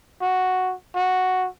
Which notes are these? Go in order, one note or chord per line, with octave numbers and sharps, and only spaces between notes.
F#4
F#4